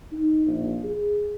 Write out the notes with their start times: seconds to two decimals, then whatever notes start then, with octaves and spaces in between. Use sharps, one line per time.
0.12 D#4
0.47 A#1
0.84 G#4